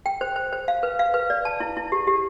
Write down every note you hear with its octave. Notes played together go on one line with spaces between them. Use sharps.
G5
C5
C5
C5
F5
B4
F5
B4
D5
A5
E4
E4
G4
G4